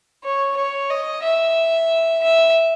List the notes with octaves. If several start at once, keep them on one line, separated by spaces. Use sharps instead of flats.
C#5
C#5
D#5
E5
E5